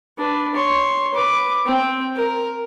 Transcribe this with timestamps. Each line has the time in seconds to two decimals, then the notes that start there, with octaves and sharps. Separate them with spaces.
0.18 D4 B4
0.54 C#5 C6
1.14 B4 D6
1.66 C4 G5
2.16 A#4